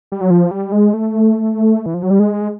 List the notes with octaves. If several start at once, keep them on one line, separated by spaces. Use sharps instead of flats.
G3
F#3
F3
G3
G#3
A3
E3
F3
F#3
G3
G#3